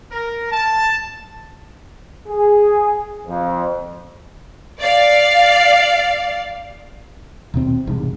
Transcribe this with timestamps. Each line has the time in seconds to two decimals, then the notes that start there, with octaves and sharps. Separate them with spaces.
0.12 A#4
0.51 A5
2.27 G#4
3.27 F2
4.79 D5 F5
7.54 D#1 B2 C4
7.87 E1 C2 G#2